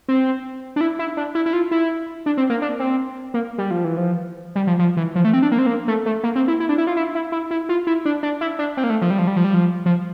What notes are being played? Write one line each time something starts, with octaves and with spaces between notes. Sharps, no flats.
C4
D4
E4
E4
D4
E4
E4
F4
E4
D4
C4
A#3
D4
C4
A#3
G3
F3
E3
F3
G3
F3
F3
E3
F3
A3
C4
D4
A#3
C4
A#3
A3
A3
A#3
C4
E4
E4
D4
E4
F4
E4
E4
E4
E4
F4
E4
D4
D4
E4
D4
C4
A#3
A3
F3
G3
F3
G3
F3
G3
F3
F3